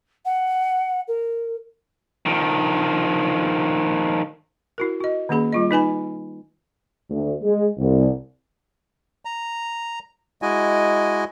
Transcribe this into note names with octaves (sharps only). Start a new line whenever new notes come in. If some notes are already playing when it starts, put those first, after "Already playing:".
F#5
A#4
D#3 F3
E4 F#4 A#4
F#4 D#5
D#3 A#3 C#4 G#4 B5
G3 F4 D#5
D#4 B4 G#5 B5
D2
G#3
C2
A#5
G#3 E4 F#4 D#5 G#5